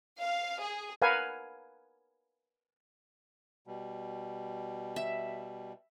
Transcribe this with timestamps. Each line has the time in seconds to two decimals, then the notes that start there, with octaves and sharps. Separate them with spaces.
0.19 F5
0.62 G#4
1.02 A#4 B4 F5 F#5 G#5
3.67 B2 G3
4.96 E5